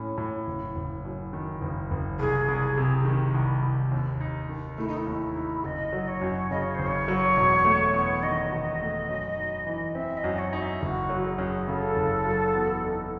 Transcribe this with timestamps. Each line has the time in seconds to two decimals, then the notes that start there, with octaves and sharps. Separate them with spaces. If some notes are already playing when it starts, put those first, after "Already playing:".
Already playing: A2 C#4
0.18 A2
0.47 F#1
0.76 F#1
1.05 F#2
1.33 D#3
1.61 F#1
1.91 F#1
2.19 C2 G#4
2.48 C2
2.77 C3
3.05 D#3
3.34 C2
3.63 C2
3.91 D#2
4.21 D#4
4.49 D#3
4.78 A3 E4
4.88 D#4
4.97 E4
5.07 D#2
5.36 D#4
5.64 F#1 D#5
5.93 F#3
6.07 C#5
6.21 F#2
6.50 C#3 D#5
6.62 C#5
6.75 F#1 C5
6.87 C#5
7.08 F#3
7.37 E1
7.65 A3
7.94 E2
8.23 D#3 D#5
8.51 E1
8.81 A3
9.09 F#2
9.37 D#4
9.66 E3
9.95 C4 E5
10.17 D#5
10.24 F#2
10.38 C#5
10.53 D#4
10.60 E5
10.82 F#1 F#4
11.10 F#3
11.24 A4
11.29 G#4
11.38 F#2
11.68 C#3 A4
11.96 F#1
12.26 F#3
12.54 E2
12.83 D#4